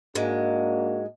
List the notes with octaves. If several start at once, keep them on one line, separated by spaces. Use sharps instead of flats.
G#2 G#3 A#3 D4 F#4